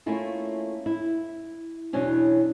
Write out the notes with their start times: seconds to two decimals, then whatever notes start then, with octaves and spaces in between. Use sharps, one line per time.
0.06 A3 A#3 C#4 E4 F4 A4
0.86 E4
1.93 E2 B2 F#3 B3 C#4 D4